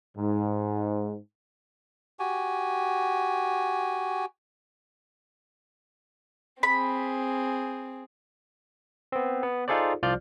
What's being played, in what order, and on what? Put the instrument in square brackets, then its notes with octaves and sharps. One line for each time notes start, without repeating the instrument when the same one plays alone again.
[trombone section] G#2
[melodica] F#4 G4 G#5
[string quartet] C4 G#4 [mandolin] B5
[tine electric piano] B3 C4
B3
D#4 F4 G#4 A4 C5 D5
C2 F3 F4 D5 F6 G6